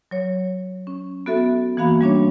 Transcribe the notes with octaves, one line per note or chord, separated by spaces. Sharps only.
F#3 C#5
C#4
B3 F#4 A4 E5
E3 A#3 F#4 F5 B5
G3 C#4 D4 C#5